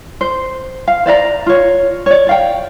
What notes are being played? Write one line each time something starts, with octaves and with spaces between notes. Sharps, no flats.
C5
F5
C5 D5 E5 A#5
F4 C#5
C#5 D5
D5 F5 G5